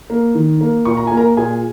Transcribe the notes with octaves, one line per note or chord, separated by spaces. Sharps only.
A#3
D#3
A#3
A#2 C#6
A#5
A#3 G#5
A#4 A#5
A#2 G#4 G#5